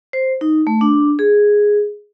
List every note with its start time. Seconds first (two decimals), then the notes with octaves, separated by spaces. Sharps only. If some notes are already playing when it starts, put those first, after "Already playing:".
0.13 C5
0.41 D#4
0.67 A3
0.81 D4
1.19 G#4